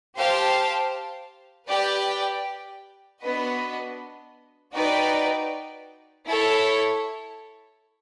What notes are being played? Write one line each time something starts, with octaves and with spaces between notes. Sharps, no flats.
G4 C5 F5 A5
G4 B4 D5 G5
B3 D4 F#4 B4 D#5
D#4 F#4 B4 D5 G5
E4 A4 C#5